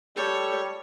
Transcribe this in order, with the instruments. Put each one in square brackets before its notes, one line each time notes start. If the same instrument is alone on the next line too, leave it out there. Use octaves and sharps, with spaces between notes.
[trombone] G3 [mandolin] G4 A4 [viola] C#5